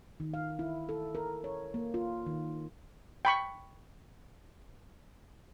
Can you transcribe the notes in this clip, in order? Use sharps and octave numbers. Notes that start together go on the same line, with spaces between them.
D#3
F5
E4
A4
A#4
C#5
A#3
F4
D#3
G5 B5 C#6